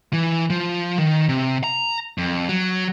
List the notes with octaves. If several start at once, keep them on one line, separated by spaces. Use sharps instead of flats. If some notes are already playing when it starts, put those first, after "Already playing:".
E3
F3
D#3
C3
A#5
F2
F#3